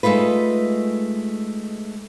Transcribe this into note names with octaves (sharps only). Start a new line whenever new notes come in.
G#3 A3 D#4 F4 B4